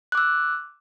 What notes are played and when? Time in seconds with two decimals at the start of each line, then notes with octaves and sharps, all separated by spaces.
0.12 F#6
0.15 D6
0.18 E6